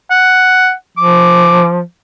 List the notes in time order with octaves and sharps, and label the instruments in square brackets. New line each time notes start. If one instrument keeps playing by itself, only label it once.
[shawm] F#5
[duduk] F3 [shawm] D6